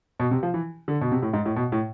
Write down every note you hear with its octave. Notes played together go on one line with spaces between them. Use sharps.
B2
C3
F3
E3
D3
B2
C3
A2
G#2
A2
B2
A2